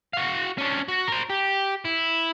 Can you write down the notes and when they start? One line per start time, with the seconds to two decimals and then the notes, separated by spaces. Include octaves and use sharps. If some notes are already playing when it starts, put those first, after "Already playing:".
0.13 F#4 F5
0.58 C#4 D4
0.88 F#4
1.08 A#4 C5
1.30 G4
1.85 E4